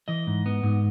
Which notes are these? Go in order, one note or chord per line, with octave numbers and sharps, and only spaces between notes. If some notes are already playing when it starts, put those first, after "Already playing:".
E3 D#5
G#2
B3
G#2